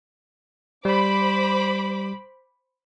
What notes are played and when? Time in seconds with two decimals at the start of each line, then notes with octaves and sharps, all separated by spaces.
0.85 G3 C5 B5 D6